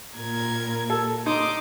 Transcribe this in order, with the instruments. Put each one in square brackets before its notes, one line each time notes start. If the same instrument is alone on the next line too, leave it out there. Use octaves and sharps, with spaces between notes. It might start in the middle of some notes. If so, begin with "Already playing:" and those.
[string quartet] A#2 A#4 G#6
[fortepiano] A4
[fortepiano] D#4 [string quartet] C6 D6 D#6